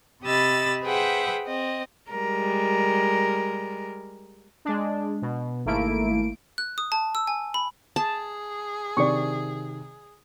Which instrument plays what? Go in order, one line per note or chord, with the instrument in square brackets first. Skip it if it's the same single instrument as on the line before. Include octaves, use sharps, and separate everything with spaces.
[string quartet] C3 G4 D#5 B5 E6 A6
G#4 B4 C5 E5 F#5 G5
C4 D#5
[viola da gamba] G3 G#3 A#4
[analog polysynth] G#3 D4
B2
G#1 A3 A#3 E4 D7
[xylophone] F#6
D#6
A5
E6
G#5
B5
[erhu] G#4 [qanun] A5
[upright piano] C3 D#3 [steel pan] D5 C#6